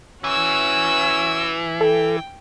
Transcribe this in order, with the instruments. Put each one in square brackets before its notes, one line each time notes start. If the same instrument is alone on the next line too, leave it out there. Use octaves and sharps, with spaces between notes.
[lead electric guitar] E3 [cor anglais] C#4 [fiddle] F#4 E6
[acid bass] A4 [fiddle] G5